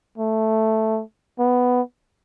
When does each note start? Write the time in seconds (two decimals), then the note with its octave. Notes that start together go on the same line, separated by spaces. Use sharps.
0.18 A3
1.39 B3